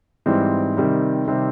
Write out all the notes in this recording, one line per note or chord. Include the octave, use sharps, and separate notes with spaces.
G#2 E3 G3 C4
C3 D#3 G3 C4
C3 D#3 G3 C4